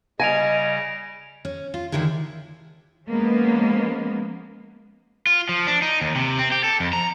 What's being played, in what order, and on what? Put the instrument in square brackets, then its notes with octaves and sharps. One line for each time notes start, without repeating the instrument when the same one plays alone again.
[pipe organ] C#3 G3 [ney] D#5 [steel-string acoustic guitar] G#5 [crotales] A#6 D7 F7
[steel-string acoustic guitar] C#4
F4
D3 D#3 G#3 E4 G#4
[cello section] F3 G#3 A#3 B3 C#4
[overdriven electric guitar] F4
F3
D4
D#4
D#2
C3
C4
G4
A4
F2
A#5